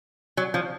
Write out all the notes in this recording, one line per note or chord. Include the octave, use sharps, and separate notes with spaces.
F#3
F3